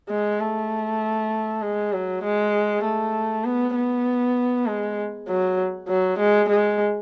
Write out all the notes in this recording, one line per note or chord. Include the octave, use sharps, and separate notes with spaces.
G#3
A3
G#3
F#3
G#3
A3
B3
B3
G#3
F#3
F#3
G#3
G#3